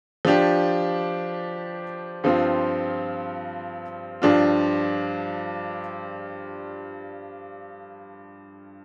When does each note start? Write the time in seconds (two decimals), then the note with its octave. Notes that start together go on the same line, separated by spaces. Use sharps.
0.25 F3 D4 G4
2.24 G2 F3 C4 F4
4.22 G2 F3 D4 F4